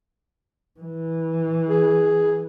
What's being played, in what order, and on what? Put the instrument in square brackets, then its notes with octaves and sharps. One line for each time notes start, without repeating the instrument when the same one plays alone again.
[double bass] E3
[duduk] G#4